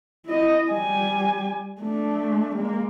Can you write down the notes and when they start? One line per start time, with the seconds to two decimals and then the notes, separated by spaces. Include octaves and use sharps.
0.26 E4 D#5
0.71 G3 G#5
1.82 A3 D4
2.56 G#3 A#3